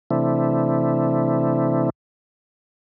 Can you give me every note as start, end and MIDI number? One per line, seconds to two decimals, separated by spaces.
0.11 1.90 48
0.11 1.90 52
0.11 1.90 57
0.11 1.90 60
0.11 1.90 62
0.11 1.90 64